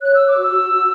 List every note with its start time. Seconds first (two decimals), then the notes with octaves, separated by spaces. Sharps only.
0.01 C#5 F#6
0.14 C#5 E6
0.27 D6
0.37 F#4 E6
0.54 F#4
0.71 F#4